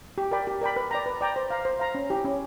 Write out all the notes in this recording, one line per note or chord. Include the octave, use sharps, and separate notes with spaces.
G4
A#4 D5 G5 B5
G4
A#4 D5 G5 B5
B4
D5 G5 A#5
B4
D5 G5 A#5
C5
F5 A#5
C5
F5 A#5
C#4
E4 G4
C#4